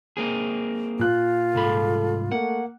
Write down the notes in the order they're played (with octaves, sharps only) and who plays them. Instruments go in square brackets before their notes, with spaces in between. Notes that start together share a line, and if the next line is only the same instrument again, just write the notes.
[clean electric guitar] A#3 C4 G#4
[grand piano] A#2 F#6 [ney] F4
[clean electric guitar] C2 G#2 B5 [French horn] A4
[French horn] A3 [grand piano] A#3 [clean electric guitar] F#5